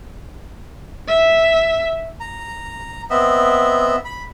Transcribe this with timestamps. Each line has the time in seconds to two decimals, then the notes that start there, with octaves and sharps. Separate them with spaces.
1.08 E5
2.20 A#5
3.10 B3 C4 D#5 E5
4.05 B5